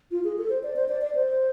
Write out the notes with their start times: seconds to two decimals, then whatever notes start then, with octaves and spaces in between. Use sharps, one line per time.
0.11 F4
0.24 G#4
0.38 A4
0.50 C5
0.63 D5
0.76 C5
0.89 D5
1.01 D5
1.15 C5